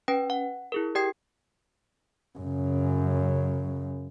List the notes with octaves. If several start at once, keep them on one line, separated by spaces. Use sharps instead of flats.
C#4 B4 G5
F#5
E4 G#4 A#4
G4 D5 G5 D#6 G#6 C7
F#2 C#3